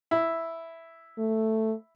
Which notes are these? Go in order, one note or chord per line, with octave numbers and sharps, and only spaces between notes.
E4
A3